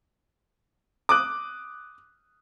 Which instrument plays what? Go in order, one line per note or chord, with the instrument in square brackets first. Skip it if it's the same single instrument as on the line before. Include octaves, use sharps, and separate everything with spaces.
[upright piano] D6 D#6 F#6